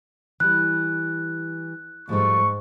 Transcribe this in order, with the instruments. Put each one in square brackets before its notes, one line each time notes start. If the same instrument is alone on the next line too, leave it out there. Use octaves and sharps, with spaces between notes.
[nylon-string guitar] E3 G3 [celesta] F#6
[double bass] G#2 [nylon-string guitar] F3 G3 A3 [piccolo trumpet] C#6